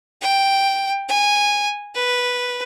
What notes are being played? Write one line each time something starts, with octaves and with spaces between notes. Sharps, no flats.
G5
G#5
B4